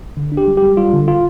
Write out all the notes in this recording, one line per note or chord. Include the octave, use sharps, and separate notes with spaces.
D3
D4
G4
G3
G4
G3
G3 F4
D3
F4